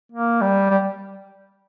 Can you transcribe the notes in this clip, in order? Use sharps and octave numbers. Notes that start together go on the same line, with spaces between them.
A#3
G3
G3